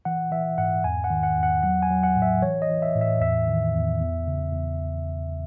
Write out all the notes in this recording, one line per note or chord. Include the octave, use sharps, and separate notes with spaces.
E3 F#5
E3 E5
G#2 F#5
E2 G#5
F#5
D#3
F#5
E2
F#5
F#3 F#5
G#5
F#3
F#5
A2
E5
E3 C#5
D#5
E3
E5
A2
E5
E2 E5
D#3
E2
E2
C#3
E2